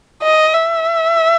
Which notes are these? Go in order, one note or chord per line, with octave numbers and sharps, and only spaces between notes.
D#5
E5